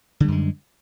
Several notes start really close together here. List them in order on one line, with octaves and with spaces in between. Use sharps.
D3 G3 F#2 G#3